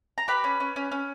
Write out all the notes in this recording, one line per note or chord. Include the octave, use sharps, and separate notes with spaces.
A#5
G4 B4 B5
C#4
C#4
C#4
C#4